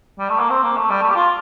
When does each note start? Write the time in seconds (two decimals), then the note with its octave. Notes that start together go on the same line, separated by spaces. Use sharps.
0.19 G3
0.29 A3
0.39 A#3
0.50 C4
0.63 A#3
0.77 A3
0.89 G3
1.02 A3
1.10 G4
1.15 F4